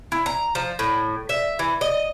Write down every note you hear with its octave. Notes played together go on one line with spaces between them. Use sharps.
E4
A#5
F3
A2
E5
E3
D#5